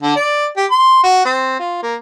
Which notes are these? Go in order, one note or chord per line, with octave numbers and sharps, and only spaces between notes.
D3
D5
G4
C6
F#4
C4
F4
A#3